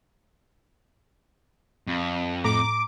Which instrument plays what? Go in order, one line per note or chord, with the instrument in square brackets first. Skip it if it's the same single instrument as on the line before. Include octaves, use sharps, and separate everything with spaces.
[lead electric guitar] F2
[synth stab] A2 A#5 [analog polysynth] D6